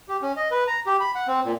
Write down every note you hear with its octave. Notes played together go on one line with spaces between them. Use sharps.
G4
C#4
D#5
B4
A#5
G4
B5
F#5
C4
A#2